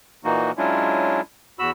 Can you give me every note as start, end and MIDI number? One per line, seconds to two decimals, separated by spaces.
0.25 0.51 46
0.25 0.51 52
0.25 0.51 58
0.25 0.51 63
0.25 0.51 66
0.58 1.21 54
0.58 1.21 56
0.58 1.21 61
0.58 1.21 62
0.58 1.21 64
0.58 1.21 65
1.59 1.71 40
1.59 1.71 66
1.59 1.71 83
1.59 1.71 88